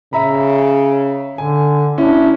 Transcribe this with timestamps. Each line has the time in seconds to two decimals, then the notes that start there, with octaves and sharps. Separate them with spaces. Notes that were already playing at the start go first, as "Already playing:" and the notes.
0.13 C#3 E5 A#5 B5
1.38 D3 G#5
1.98 C#4 D4 E4